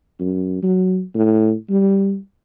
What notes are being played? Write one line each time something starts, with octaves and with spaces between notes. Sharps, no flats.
F#2
F#3
A2
G3